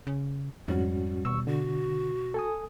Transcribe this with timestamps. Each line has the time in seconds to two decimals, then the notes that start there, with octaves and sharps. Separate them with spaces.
0.07 C#3
0.68 F2 G#2 G3 C#4 F#4
1.25 D#2 B2 C#6 E6
1.47 D3 F#4
2.34 A4 G#5 D#6